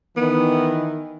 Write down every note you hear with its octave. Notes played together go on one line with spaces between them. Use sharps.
D#3 E3 B3